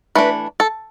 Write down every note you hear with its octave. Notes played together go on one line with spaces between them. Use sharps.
E3 A3 D4 B4
A4